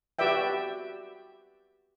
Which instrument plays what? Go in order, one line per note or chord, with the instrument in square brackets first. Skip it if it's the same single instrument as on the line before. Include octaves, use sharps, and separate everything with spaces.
[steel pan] F#4 G4 B4 D5 E5 G5